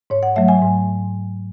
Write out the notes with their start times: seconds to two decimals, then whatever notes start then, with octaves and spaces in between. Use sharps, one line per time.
0.10 G#2 C#5
0.23 F#5
0.36 F#3 A3 E5
0.48 G#5
0.62 G#2